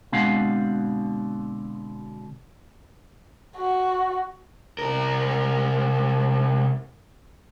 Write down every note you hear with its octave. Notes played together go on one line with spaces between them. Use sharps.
B2 D3 G#3 C4 F5 F#5
F#4
C2 A#4